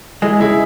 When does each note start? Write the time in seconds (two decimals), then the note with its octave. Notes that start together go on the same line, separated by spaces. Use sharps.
0.22 G#3 E4 G#4
0.40 C#2 E4 G#4